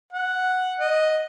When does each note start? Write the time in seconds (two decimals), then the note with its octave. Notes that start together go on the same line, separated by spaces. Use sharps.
0.13 F#5
0.79 D#5